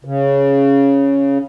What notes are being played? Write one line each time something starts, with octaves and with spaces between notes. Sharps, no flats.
C#3